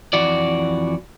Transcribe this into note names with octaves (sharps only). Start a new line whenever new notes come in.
F2 E3 F#4 D5